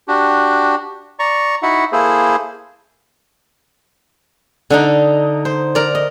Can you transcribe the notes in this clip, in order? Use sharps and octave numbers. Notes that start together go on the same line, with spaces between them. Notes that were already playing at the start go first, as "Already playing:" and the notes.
D4 F#4 G4
D5 A#5 C#6
D#4 E4 F#4 E5 F#5
A#3 E4 G#4 A4 C5
D3 D4 D#4
C5
A#4 D5
D#5